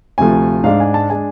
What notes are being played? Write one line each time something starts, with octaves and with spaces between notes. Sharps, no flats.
D2 C3 F3 A3 G#5
G#2 G#3 D4 F5
G#5
A5
G#3 D4 G#5